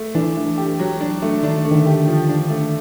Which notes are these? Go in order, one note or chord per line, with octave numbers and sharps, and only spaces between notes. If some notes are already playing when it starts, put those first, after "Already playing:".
Already playing: A3
E3 D4
A3
G4
F#3
D4
A3
D#3 D4
A3
D#3
D3
G4
F3
D4
A3